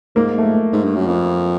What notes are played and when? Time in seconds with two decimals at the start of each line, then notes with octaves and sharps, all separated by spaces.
0.16 G#2 A#3
0.38 A3
0.72 G#2
0.84 G2
0.96 F#2
1.07 F2